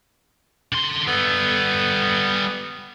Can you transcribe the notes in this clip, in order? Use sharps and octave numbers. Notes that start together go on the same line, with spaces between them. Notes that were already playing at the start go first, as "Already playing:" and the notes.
D3 C6
G3 B3 A4